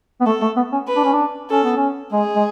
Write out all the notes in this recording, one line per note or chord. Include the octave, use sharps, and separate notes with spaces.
B3
A3 A4
A3
B3
C#4
B4
D4
C#4
D4
C#4 A4
B3
C#4
G#3 G#4
G#3